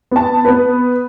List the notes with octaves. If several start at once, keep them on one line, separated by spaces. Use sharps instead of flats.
B3 A5
B3 B4